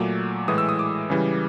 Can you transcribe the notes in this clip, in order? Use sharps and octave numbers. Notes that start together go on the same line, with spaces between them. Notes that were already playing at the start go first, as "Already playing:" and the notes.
Already playing: A#2 F#3 A3 D6
A2 E3 G#3 D#6
E6
D#6
D6
C#3 E3 G3